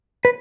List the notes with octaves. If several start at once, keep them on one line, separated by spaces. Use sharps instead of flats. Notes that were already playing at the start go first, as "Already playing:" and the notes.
B4